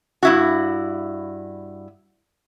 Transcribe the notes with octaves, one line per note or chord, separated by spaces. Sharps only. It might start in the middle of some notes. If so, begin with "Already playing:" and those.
G2 E4 F#4